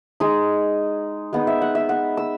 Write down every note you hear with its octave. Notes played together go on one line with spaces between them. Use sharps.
G#3 D#4
G#3 B3 D#4
E5
F#5
E5
F#5
E6